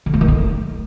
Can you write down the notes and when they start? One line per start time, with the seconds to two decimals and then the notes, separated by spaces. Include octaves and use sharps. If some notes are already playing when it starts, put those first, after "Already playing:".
0.06 D3
0.14 A3
0.21 D#3
0.28 A3